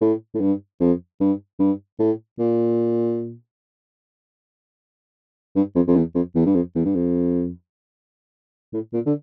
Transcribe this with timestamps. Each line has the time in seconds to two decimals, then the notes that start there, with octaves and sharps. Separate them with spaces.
0.01 A2
0.34 A2
0.41 G2
0.80 F2
1.20 G2
1.59 G2
1.99 A2
2.39 A#2
5.56 G2
5.75 F2
5.87 F2
5.96 E2
6.15 F2
6.35 E2
6.46 G2
6.55 F2
6.75 E2
6.85 G2
6.95 F2
8.73 A2
8.93 A#2
9.06 D3